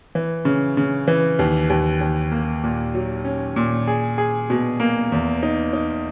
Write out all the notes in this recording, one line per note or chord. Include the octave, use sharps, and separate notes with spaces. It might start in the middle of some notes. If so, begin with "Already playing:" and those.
E3
C#3
C#3
E3
D#2
D#2
D#2
A#3
A#2
F#3
C#4
A#2
G#4
G#4
B2
A#3
E2
D#4
D#4